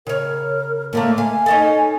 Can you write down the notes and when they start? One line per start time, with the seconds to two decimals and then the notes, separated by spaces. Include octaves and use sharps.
0.07 C#3 A#4 C#5
0.93 A2 D3 A3 A#3
1.18 F5 G#5
1.46 C#4 D#4 A4